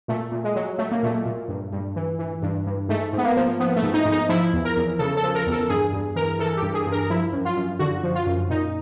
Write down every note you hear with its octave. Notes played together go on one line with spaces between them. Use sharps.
A#2 A3
A#2
G#3
F#3
F#3 A3
A#3
A#2 A3
A#2
G2
G2
E3
E3
G2
G2
G#2 A3
G#2 B3
A#3
F3
F3 B3
A3
G#2
D#4
G#2
D#4
F3 E4
E2
A#4
E2
C#3 A4
A4
F3
A#4
E2
A4
G2 G#4
G2
E3 A#4
E3 A4
G4
G2
G#4
G2
A#4
F3 E4
F#2
F4
F#2
D3 F#4
F3
F4
F#2
A#2 D#4